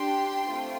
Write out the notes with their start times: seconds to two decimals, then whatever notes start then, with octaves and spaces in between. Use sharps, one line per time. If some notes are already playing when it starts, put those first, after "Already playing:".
Already playing: D4 G4 G5 C6
0.47 A3 C4 F4